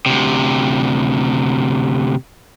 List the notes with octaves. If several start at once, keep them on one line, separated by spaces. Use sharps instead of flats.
D2 C3